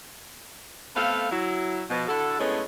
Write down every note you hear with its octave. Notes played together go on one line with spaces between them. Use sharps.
A3 B3 C4 A4 F5
F#3 E4
B2 F3
D3 E4 F#4 A4
A2 D3 G#3 A3 B3 C#4